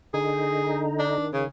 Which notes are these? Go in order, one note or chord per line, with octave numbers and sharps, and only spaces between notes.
D3 D#4 G#4
D4
D#3
C#3